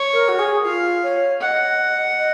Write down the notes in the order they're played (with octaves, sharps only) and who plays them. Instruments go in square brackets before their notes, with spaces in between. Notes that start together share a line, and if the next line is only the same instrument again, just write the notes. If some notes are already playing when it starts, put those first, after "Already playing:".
Already playing: [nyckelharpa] C#5
[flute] A#4
F#4
G#4
[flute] F4 [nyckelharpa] F5
[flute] C#5
[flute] D#5 [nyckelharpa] F#5
[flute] D#5